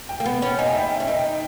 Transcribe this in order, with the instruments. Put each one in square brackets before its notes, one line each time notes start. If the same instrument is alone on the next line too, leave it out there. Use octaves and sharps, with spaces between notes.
[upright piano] G5
[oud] A#3
B3
C#4
[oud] D#4 [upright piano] G#5
[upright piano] G5
E5
G5
[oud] C#4
[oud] D#4 [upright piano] G5